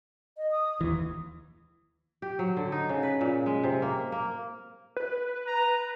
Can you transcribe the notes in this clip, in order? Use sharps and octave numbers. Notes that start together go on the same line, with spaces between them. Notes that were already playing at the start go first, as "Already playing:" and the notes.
D#5
D#6
D#2 E3
G4
F#3
D3
D#4
C#3
B4
A#2
G#3
C3
A#3
A#3
B4
A#5